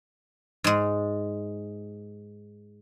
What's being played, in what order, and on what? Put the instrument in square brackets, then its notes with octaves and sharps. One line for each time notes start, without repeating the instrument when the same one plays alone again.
[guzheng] G#2 G#3